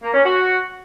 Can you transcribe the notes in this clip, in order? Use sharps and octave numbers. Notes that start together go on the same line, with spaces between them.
A#3
C#4
F#4